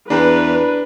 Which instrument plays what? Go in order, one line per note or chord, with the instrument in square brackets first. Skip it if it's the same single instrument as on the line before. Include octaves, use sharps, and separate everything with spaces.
[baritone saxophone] E2 [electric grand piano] D4 A#5 [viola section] B4